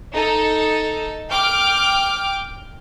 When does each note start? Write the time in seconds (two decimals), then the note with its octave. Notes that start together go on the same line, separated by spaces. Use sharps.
0.13 D#4 A4
1.28 G5 D6 F6